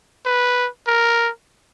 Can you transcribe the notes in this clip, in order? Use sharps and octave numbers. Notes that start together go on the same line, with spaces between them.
B4
A#4